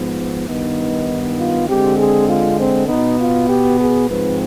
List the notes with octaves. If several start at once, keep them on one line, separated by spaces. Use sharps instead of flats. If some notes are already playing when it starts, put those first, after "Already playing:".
Already playing: G#2 F3 B3
G2 D#3 B3 D#4
F4
D3 G#3 C4 G4
G#4
F4
C4
B2 B3 D#4
F4
G4
G#4
G#2 F3 C4 B4